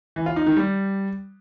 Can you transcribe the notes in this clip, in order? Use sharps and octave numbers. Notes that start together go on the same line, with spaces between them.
E3
F4
D#4
D#3
G3